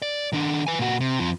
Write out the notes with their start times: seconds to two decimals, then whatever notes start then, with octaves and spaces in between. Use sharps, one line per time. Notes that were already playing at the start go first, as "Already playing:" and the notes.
0.02 D5
0.33 D#3 D4
0.67 B4 G#5
0.79 A#2 F#4
1.00 C3
1.19 F2 F3